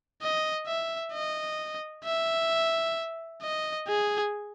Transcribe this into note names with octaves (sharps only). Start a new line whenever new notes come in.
D#5
E5
D#5
E5
D#5
G#4